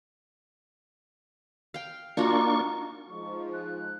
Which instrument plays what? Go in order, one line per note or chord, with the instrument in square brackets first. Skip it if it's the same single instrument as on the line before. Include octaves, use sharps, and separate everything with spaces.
[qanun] F5 G5
[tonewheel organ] A#3 D4 C#6 [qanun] D#4 F4 F#4
[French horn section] F3 G#3 D#4 [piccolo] C#6
[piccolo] F#6